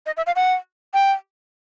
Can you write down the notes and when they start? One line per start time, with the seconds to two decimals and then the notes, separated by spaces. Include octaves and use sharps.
0.06 D#5
0.17 E5
0.26 F5
0.36 F#5
0.94 G5